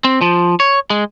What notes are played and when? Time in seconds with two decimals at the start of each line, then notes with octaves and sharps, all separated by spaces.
0.04 C4
0.22 F3
0.60 C#5
0.90 G#3